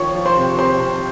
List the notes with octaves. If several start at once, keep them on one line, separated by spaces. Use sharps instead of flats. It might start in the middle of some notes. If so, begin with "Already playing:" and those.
Already playing: D#3 F3 C#5 C#6
F3
C5 C6
C3
C3 C5 C6
C3